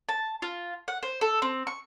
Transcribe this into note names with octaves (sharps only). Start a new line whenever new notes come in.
A5
F4
F#5
C5
A4
C4
C#6